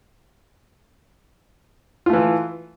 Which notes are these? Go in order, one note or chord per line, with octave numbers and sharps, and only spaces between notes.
E3 A3 F4